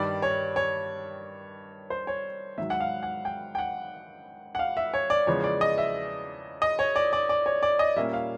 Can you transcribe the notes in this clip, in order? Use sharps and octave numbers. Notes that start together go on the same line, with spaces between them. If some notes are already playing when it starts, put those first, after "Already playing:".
Already playing: G2 D#3 G3 D5
C#5
C#5
C5
C#5
G#2 D#3 F#3 E5
F#5
F5
F#5
G5
G5
F#5
F#5
F5
E5
C#5
D5
E2 C#3 F3 G#3 C#5
D5
D#5
E5
D#5
C#5
D5
D5
D5
C#5
D5
D#5
A#2 G3 A#3 C#4 E5
F5